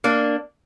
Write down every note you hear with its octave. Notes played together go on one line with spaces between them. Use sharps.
A#3 D4